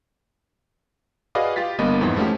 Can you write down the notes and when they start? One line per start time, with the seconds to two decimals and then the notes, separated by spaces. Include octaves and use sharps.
1.35 F#4 G#4 B4 D5 D#5 F5
1.56 F4 G4 A6 B6
1.79 G1 G2 A#3 B3 B4 D#5
2.01 F2 G#2 E3
2.17 F3 G#3 A3 C#4 F#4 G4